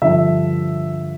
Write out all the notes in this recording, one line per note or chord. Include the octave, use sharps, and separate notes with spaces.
G2 D3 F3 E5